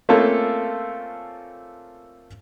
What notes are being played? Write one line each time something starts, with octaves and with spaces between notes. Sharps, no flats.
A3 A#3 C4 C#4 F4 A4